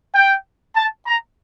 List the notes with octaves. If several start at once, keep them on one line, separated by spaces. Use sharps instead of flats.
G5
A5
A#5